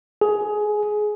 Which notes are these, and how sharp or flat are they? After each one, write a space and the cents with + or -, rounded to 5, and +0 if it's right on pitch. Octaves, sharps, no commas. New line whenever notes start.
G#4 +15